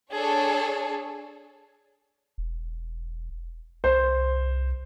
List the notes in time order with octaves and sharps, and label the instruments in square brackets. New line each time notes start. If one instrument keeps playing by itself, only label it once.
[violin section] D4 G#4 A4 C#5
[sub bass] E1
[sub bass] C2 [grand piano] C5